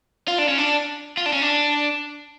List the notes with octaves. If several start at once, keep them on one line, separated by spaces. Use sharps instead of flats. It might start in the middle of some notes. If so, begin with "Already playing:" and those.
F4
D4
C#4
D4
F4
D4
C#4
D4